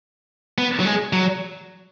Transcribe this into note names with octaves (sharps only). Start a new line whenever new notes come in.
B3
F#3
G#3
F#3